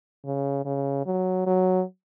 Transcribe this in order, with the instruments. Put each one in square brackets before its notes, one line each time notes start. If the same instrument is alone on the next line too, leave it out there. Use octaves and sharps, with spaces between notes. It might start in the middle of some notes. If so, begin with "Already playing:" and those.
[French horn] C#3
C#3
F#3
F#3